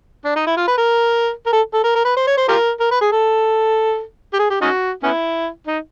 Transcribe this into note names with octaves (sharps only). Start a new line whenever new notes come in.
D4
D#4
E4
F4
B4
A#4
A#4
A4
A4
A#4
A#4
B4
C5
C#5
C5
F4 G4 A#4
A#4
B4
G#4
A4
G4
G#4
G4
C#4 D#4 F#4
B3 C#4 E4
D#4